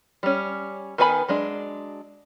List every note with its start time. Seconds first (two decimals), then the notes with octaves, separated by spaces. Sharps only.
0.23 G3 C#4
0.98 D#3 B3 B4 G#5 B5
1.28 F#3 G#3 D4